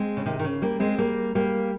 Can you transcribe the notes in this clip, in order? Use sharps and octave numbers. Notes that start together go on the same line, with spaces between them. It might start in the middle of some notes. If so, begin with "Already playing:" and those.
Already playing: G#3 C4
C#3
C3 D#3
D#3
C#3
G3 A#3
G#3 C4
G3 A#3
G3 A#3